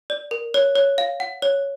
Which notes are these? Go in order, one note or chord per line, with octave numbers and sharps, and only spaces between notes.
D5
A#4
C#5
C#5
F5
F#5
C#5